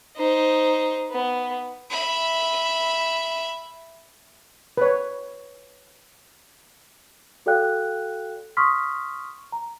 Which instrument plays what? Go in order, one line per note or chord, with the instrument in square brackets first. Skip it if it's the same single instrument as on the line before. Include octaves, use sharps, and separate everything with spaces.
[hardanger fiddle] D#4 C5
B3
[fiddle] E5 B5
[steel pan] B4 C#5
[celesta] F#4 A4 D5 F5 G5 F#6
C6 C#6 D#6 F6 B6
A#5